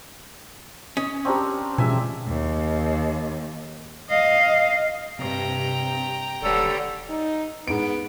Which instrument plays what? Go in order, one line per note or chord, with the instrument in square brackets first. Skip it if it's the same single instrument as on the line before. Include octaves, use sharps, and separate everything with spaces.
[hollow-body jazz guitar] C#4 [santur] D#5
[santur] C4 D4 A#4 [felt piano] G4 C5 C#6
[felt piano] A1 F3 G#3 [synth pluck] B2 [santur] G4 E5 G#5
[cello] D#2
D#5 F5
[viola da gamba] G2 [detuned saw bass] C3 [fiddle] G5 A#5
[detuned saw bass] D#1 [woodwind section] D3 A4 [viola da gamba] G3 B4 C#5
[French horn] D#4
[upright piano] G#2 D7 [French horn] B3